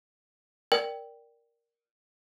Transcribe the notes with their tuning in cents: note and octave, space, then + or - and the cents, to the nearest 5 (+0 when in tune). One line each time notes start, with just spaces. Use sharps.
A#4 +0 D5 +0 G5 +0